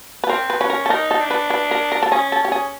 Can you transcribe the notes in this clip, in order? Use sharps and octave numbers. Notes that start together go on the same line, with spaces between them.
B4
C4 A#4
B4
C#4 B4
A#4
A4
D#4 A#4
A4
D4
B4
B4
A#4
A#4
A4
C#4 G#4
A4
C#4 G4
G#4